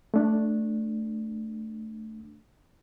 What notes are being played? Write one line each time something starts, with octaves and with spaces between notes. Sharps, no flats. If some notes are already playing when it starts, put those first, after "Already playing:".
A3 D4